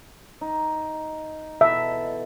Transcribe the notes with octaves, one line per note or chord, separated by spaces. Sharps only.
D#4
B2 E3 A4 E5